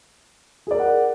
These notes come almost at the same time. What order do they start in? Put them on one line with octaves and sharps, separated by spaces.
G#4 D5 A#4 F#5